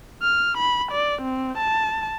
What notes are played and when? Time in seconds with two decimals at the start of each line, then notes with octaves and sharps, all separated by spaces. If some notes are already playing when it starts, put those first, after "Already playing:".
0.23 F6
0.57 B5
0.91 D5
1.22 C4
1.58 A5